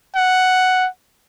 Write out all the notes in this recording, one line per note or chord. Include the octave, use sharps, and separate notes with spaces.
F#5